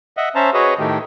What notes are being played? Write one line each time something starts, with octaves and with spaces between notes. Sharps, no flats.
D#5 E5 F#5
C#4 C5 E5 A5 A#5
F#4 G#4 B4 C#5 D#5
A2 D#3 A3 G4